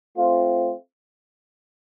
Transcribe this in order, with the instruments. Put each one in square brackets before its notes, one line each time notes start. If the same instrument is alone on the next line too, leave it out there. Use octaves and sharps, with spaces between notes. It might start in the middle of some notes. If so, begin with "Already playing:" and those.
[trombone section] A3 C4 F4